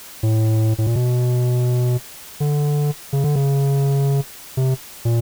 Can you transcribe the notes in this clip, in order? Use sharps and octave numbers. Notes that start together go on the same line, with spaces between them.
A2
A2
A#2
B2
D3
C#3
D3
C#3
C3
A#2